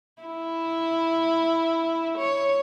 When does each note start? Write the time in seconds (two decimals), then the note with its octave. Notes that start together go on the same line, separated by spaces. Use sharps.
0.22 E4
2.18 C#5